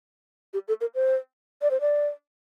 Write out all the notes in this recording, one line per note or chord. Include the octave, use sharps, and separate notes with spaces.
G4
A4
A#4
C5
D5
C5
D5